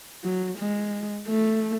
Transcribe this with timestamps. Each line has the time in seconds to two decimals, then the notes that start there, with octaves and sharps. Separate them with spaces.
0.24 F#3
0.58 G#3
1.28 A3